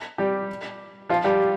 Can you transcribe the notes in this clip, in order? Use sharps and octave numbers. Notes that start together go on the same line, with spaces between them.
G3 G4
F3 F4
G3 G4